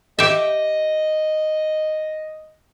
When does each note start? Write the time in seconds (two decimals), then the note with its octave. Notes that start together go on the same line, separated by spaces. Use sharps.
0.19 G4 D#5 E5